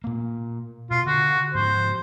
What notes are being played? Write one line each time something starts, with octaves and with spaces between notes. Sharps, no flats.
A#2 A#3
B2 F4
D3 F#4
G#2 F3 C5